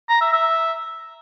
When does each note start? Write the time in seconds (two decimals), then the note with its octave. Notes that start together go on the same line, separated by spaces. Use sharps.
0.09 A#5
0.21 E5
0.33 E5